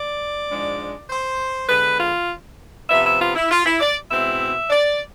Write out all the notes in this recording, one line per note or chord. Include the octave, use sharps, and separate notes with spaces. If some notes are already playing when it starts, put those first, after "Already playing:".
Already playing: D5
G#2 F3 G#3 D4
C5
D3 G#3 B3 B4
F4
C3 F3 B3 E5
E5
F4
E4
F4
E4
D5
B2 G#3 C4 E4 E5
D5